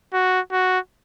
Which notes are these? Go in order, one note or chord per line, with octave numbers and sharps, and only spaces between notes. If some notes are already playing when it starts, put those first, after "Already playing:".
F#4
F#4